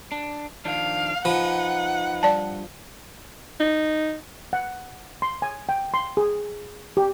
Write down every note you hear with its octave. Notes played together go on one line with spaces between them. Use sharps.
D4
D#3 F3 D4 F5
F3 D#4 B4 F#5
G2 D5 A5
D#4
F#5
C6
G#5
G5
C6
G#4
G4